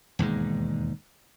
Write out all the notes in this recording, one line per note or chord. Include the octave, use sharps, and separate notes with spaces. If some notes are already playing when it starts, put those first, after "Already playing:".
E1 D#2 G#2 G#3